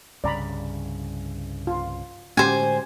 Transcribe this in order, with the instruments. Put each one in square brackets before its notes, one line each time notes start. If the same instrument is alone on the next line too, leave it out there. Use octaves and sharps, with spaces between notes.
[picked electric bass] C2 G2 C#3 [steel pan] D5 A#5 B5
[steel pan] F4
[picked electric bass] A2 D3 G#3 [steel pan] C#4 F#4 G4 [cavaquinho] C5 G#5